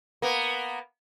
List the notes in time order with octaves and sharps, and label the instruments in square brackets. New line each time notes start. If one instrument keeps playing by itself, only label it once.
[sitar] A#3 B3